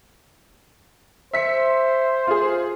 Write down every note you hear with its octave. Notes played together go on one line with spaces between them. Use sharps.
C5 E5 B6 C#7
F4 G#4